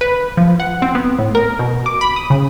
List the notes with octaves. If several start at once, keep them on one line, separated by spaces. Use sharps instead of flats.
B4
F3
F#5
C4
B3
A2
A#4
B2
D6
B5
D#6
C#3